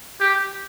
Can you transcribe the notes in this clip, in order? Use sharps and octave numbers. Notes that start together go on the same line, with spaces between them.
G4